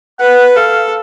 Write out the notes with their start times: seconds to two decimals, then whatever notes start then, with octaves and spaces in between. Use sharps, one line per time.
0.19 B4 F#5
0.56 A4 F5